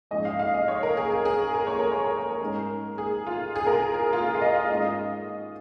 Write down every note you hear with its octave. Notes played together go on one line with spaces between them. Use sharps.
A#1 G#2 G#3 C#4 D#5
F5
F5
D#5
C#5
A#4
G#4
G#4
G#4
A#4
C#5
A#4
C#5
A#4
C#5
A#4
G#2 G#3 C#4
G#4
F4
G#4
A#4
G#4
G#4
F4
G#4
F5
D#5
F5
G#2 G#3 C#4 D#5